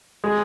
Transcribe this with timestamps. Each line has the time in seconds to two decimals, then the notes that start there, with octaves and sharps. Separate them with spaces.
0.24 G#3